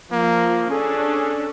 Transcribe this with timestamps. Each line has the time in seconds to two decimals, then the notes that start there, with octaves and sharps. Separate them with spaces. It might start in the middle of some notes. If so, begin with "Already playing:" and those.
0.12 F3 A#3
0.70 C#4 D4 G#4 A4